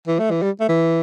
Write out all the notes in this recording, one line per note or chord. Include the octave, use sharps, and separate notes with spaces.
E3
A3
E3
G3
A3
E3